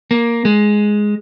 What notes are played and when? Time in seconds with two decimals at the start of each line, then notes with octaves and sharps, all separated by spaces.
0.11 A#3
0.45 G#3